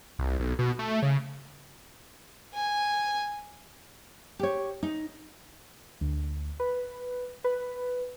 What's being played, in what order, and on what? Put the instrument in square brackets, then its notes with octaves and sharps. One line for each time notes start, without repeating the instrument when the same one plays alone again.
[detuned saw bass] C2
B1
B2
A3
C#3
[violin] G#5
[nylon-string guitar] G4 C#5
D#4
[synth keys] D2
B4
B4